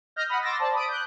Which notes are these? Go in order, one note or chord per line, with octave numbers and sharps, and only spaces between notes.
D#5 F6 G6 A#6
F#5 B5 D#6 F6
C6 D6 E6 A6 A#6
C5 D5 A5
B5 D#6 D7
F#6 G6